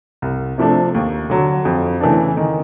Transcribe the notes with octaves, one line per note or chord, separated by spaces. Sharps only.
C2
C3 F3 A3 D4
D#2
D3 F#3
F2
C#3 E3 A3 D4
D#3